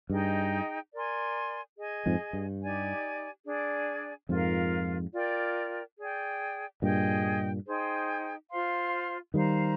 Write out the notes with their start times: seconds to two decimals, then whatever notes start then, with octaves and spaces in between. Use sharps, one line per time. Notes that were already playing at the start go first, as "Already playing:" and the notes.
0.10 G2 D#4 G#4 D#5 G5
0.93 A#4 D5 G#5 C6
1.77 G#4 D#5 G#5
2.06 F2 G#2
2.33 G2
2.62 D#4 G4 D5 G#5
3.46 D4 G#4 D5 G#5
4.29 F2 G#2 F4 A#4 F5
5.14 F4 A#4 D5 G5
5.98 G#4 D5 G5
6.82 G2 A#2 G#4 D#5 G5
7.67 D#4 G#4 C5 G5
8.50 F4 C5 F5 C6
9.34 D#3 G3 C5 F5 A#5